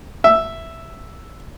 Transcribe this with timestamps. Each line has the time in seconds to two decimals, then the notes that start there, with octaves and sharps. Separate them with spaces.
0.24 E5